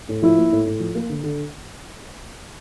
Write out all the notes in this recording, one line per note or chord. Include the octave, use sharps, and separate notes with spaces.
A2
F3 E4
A#3
A2
A2
F3
A#3
D3
D3